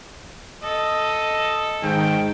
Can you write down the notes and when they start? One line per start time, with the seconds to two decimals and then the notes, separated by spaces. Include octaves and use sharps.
0.64 A4 D#5
1.83 G#2 D#3 G5